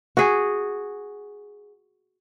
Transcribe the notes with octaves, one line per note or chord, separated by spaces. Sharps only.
F#4 G#4